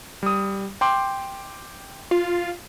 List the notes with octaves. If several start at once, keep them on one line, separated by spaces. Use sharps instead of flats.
G3 D#6
G5 C6 D6
F4